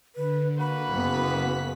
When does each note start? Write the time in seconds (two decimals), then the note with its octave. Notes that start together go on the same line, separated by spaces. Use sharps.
0.16 D3 B4
0.59 A#3 F#4 B4 B5
0.90 F#1 B3 B6